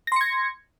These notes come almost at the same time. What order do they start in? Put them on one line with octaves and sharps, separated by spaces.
A#6 C6 C#7 G#6